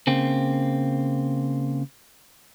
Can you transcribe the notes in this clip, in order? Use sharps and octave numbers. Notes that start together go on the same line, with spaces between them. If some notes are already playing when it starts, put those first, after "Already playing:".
C#3 A#3 C4